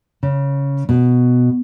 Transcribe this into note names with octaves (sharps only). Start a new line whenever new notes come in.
C#3
B2